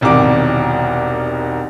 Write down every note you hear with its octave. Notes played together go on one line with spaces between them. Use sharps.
E1 C2 D#3 D6